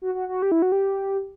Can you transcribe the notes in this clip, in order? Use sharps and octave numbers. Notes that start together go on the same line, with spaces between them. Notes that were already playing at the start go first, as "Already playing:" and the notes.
F#4
F#4
F#4
G4
E4
F#4
G4